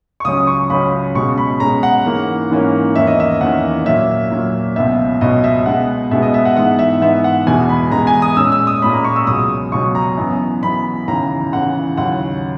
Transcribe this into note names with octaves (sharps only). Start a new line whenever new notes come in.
C#6
C#2 C#3 F#3 C#4 D#6
C#6
C#2 C#3 F#3 C#4 B5
B2 G#3 C#4 C#6
B5
B2 G#3 C#4 A#5
F#5
G#2 E3 A#3 C#4
G#2 E3 A#3 C#4
E2 D#3 A#3 C#4 E5
D#5
E5
E2 D#3 A#3 C#4 F#5
A#2 F#3 A#3 E5
A#2 F#3 A#3
C#2 B2 F#3 B3 E5
C#2 B2 F#3 B3 D#5
E5
B2 G#3 B3 F#5
B2 G#3 B3 E5
D#5
E5
F#5
G#2 E3 B3 F#5
E5
G#2 E3 B3 E5
F#5
E2 B2 G#3 G#5
B5
E2 B2 G#3 A#5
G#5
D#6
A#2 G#3 C#4 E6
E6
D#6
A#2 G#3 C#4 B5
A#5
C#6
E6
C#2 B2 F#3 D#6
C#2 B2 F#3 C#6
A#5
F#2 E3 B3
F#2 E3 B3 B5
D#2 C#3 E3 A#5
D#2 C#3 E3 F#5
D#2 C#3 F#3 F#5